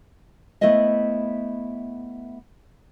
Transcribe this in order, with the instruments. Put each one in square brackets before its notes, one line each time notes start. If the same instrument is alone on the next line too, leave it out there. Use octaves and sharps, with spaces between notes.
[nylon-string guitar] A3 B3 E4 C5 D#5 E5